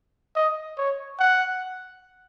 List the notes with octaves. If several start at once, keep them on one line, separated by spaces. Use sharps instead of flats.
D#5
C#5
F#5